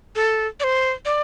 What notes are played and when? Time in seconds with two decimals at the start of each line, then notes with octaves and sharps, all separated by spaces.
0.16 A4
0.60 D5
0.64 C5
1.05 D5